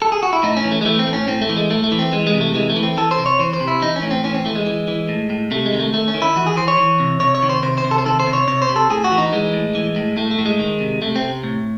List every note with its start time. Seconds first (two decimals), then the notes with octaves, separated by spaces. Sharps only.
0.02 A4
0.12 G#4
0.23 F#4
0.33 E4
0.43 A2 D#4
0.57 C#4
0.64 E3
0.71 A3
0.81 G#3
0.85 E3 A3
0.99 C4
1.07 A2
1.13 C#4
1.28 A2 C4
1.42 A3
1.49 E3
1.57 G#3
1.70 A2 A3
1.84 A3
1.92 E3
1.99 C4
2.12 E3 G#3
2.27 G#3
2.34 C3
2.41 A3
2.55 E3 G#3
2.70 A3
2.76 E3
2.83 C4
2.97 E3 A4
3.11 C5
3.18 C3
3.26 C#5
3.39 E3 C5
3.53 C5
3.60 C3
3.68 E4
3.82 E3 D#4
3.96 C#4
4.02 A2
4.11 C4
4.24 E3 C#4
4.35 C4
4.45 E3 A3
4.55 G#3
4.66 E3
4.88 E3
5.09 A2
5.30 A2
5.51 C3 A3
5.66 G#3
5.73 D#3
5.80 A3
5.93 D#3 A3
6.08 C#4
6.14 D#3
6.22 E4
6.36 E3 F#4
6.46 G#4
6.57 E3 C5
6.68 C#5
6.78 E3
7.00 C3
7.20 C3 C#5
7.35 C#5
7.42 D#3
7.49 C5
7.63 C3 C5
7.78 C5
7.84 C3
7.91 A4
7.98 C5
8.06 D#3 A4
8.20 C5
8.27 C3
8.33 C#5
8.48 C3 C#5
8.62 C5
8.69 C3
8.76 A4
8.90 A2 G#4
9.04 F#4
9.12 E3
9.18 D#4
9.33 E3 G#3
9.53 A2
9.75 E3
9.96 A2
10.17 A2 A3
10.31 A3
10.39 A2
10.46 G#3
10.59 D#3
10.80 C3
11.02 C3 A3
11.16 C4
11.22 C3
11.44 A2